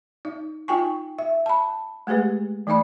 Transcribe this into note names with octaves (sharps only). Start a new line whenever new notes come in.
D#4
D#4 F4 G5 G#5 C#6
E5
A5 B5
G#3 A3 G4 G#4 B4
E3 A3 D#4 D5 B5